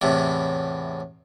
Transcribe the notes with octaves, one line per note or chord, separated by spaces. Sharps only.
E2 A2 C3